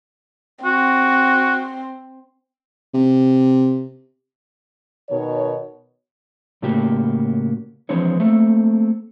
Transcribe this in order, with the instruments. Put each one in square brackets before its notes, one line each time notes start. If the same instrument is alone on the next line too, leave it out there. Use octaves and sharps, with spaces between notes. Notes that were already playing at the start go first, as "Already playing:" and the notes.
[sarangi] C4 [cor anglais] F#4
[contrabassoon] C3
[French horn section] B2 D#3 A#4 C#5
[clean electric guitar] A2 C#3 A3 A#3 F#4 G4
E3 F3 G#3 C4 D4 C#5
A3 A#3 C4 A4